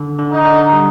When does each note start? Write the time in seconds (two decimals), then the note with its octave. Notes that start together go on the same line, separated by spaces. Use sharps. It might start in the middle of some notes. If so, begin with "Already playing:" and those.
Already playing: D3
0.18 D3
0.32 D#4
0.45 D3
0.73 G3